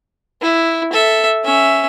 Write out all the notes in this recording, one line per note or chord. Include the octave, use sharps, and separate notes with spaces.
E4
A4 E5
C#4 E5